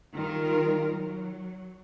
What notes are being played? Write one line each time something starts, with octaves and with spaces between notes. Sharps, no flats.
D#3 G3 F4 A#4
F#3